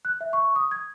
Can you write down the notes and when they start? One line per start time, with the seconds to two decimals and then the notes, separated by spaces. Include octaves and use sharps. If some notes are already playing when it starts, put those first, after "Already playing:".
0.05 F#6
0.21 E5
0.33 C#6
0.56 D#6
0.71 G#6